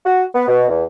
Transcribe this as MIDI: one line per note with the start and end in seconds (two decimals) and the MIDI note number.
0.06 0.24 66
0.35 0.47 59
0.48 0.66 47
0.68 0.84 40